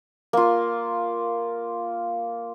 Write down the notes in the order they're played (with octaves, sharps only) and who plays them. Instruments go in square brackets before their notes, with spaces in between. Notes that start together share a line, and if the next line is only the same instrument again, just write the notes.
[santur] A#3 F4